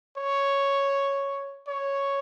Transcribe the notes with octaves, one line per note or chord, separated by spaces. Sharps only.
C#5
C#5